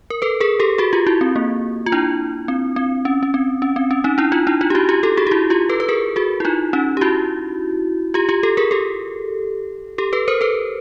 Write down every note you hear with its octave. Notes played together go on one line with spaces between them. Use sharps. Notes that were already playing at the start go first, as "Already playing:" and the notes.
A#4
A4 B4
G#4 A#4
G4 A4
F#4 G#4
F4 G4
E4 F#4
C4
A#3
F4
D4 E4
C4
C4
C#4
C#4
C4
C#4
C4
C#4
C#4 D#4
D4 E4
D#4 F4
D4 E4
D#4 F4
G4
E4 F#4
F4 G4
G4 A4
F#4 G#4
G4
E4 F#4
F4 G4
A4 B4
B4
G#4 A#4
F#4 G#4
E4
D#4 F4
C#4 D#4
G4
E4 F#4
F4 G4
F4 G4
G4 A4
G#4 A#4
G4 A4
G4 A4
A4 B4
A#4 C5
A4 B4